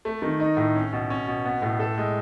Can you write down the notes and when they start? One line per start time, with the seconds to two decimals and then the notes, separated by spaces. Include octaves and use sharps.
0.05 A3
0.22 D#3
0.40 D#4
0.57 A2
0.76 C#4
0.93 B2
1.10 C#4
1.27 B2
1.45 B3
1.62 A2
1.80 A4
1.98 G#3